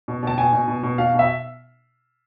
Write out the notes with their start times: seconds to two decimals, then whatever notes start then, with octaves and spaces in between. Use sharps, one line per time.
0.08 B2
0.23 B2 A5
0.38 B2 G#5
0.53 B2
0.68 B2
0.83 B2
0.98 B2 F5
1.14 B2 E5